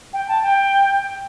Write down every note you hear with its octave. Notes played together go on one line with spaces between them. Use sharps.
G5
A5
G5